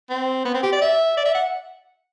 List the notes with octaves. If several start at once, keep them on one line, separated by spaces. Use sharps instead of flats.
C4
B3
C4
G4
D5
E5
D5
E5
F#5